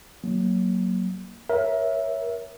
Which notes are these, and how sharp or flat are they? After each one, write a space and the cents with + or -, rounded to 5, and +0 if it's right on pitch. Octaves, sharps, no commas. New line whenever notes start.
F#3 +10 A#3 +0
A#4 +25 C#5 +0 E5 +0